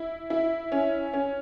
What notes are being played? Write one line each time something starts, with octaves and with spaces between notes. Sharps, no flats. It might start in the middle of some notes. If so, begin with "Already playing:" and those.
Already playing: E4
E4
C#4
C#4